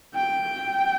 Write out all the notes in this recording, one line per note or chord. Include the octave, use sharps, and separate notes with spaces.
G5